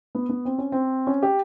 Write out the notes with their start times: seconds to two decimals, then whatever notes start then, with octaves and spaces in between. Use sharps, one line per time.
0.15 B3
0.29 B3
0.45 C4
0.58 C#4
0.72 C4
1.07 C#4
1.23 G4